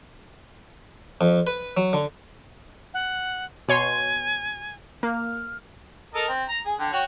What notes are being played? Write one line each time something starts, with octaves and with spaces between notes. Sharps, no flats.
F2
B4
F#3
D3
F#5
B2 C#5 G#5 C6
A#3 F6
A4 A#4 D#5
C4
A#5
G#4
D3 G5
F#4 C#5 G5